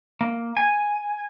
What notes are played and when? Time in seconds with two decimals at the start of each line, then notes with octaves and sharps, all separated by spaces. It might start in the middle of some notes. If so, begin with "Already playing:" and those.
0.21 A#3
0.57 G#5